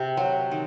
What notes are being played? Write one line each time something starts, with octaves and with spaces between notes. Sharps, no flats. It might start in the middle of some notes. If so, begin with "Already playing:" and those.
Already playing: C3
F#3 C5
D#3